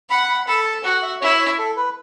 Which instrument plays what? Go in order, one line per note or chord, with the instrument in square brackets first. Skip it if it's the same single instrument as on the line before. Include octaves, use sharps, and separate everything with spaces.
[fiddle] F#5 [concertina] B5
[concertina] B5
[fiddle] A4 [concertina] B5
[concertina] A5
[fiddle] F#4 [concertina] F#5
[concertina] E5
[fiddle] E4 [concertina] C#5
[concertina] C#5
A4
B4